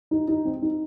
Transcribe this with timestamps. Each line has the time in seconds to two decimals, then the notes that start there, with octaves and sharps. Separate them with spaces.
0.11 D#4
0.28 D#4
0.45 C4
0.62 D#4